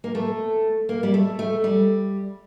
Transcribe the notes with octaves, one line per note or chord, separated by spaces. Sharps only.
A#3
A3
A#3
G3
A3
A3
G3